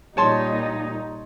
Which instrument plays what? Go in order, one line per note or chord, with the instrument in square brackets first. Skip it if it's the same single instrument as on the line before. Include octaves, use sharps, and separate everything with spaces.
[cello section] A#2 G3 D#4 [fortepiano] C#5 A5 C6